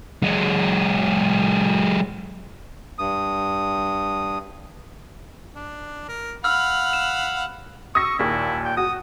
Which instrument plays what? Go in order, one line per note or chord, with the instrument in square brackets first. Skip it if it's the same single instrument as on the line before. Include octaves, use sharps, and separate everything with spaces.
[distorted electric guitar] F#3 G#3
[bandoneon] G2 D#6
[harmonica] D4
A#4
[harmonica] F5 F#5 B5 [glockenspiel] E6 F6
[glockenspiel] E7
[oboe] C#6 [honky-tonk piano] D#6 E6 A#6
[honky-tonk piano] D#2 A#2 [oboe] E4
[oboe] G5
[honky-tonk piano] F#4 [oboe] D#6